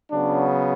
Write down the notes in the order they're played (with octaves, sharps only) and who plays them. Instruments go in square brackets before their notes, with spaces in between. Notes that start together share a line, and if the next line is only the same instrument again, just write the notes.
[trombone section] C#3 F#3 B3 D4